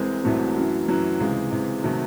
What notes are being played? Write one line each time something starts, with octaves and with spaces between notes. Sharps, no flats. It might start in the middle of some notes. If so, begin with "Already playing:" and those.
Already playing: C2 C3 E3 G#3 C4
C2 C3 E3 F#3 A3
F#2 E3
F#2 E3 F#3
C#2 C3 E3 G#3
C#2 C3 E3
C3 D#3 F#3 A3